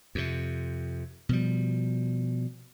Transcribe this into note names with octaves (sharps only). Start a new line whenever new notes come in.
F2 C3
B2 F3 G3